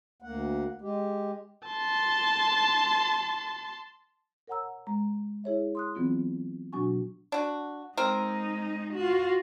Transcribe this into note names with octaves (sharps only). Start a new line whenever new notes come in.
D2 A#3 F#5
G#3 G4
A5 C6
A#4 C#5 F#5 G#5 A#5 E6
G#3 A#5
E4 G#4 C#5 E5
C6 D#6 F#6
E3 F#3 B3 C4 F4
B2 F#3 D4 F#4 G#5 C#6
D4 F#4
G#3 C4 D#4 A#4
F4 F#4